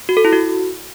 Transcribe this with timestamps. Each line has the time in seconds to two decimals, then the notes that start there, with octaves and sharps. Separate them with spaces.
0.09 F#4
0.17 A4
0.25 E4
0.32 F#4